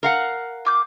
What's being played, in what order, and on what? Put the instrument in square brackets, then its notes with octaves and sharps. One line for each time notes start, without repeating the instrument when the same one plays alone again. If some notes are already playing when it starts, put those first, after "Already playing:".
[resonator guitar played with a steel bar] A#4 F5 F#5
[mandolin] F4 D6 G6